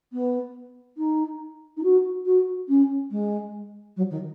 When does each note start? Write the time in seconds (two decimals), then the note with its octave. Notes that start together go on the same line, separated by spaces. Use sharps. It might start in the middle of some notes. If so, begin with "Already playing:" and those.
0.13 B3
0.97 D#4
1.77 D#4
1.83 F#4
2.26 F#4
2.68 C#4
3.11 G#3
3.96 F#3
4.10 D#3